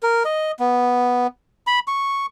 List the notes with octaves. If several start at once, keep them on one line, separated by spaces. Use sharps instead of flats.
A#4
D#5
B3
B5
C#6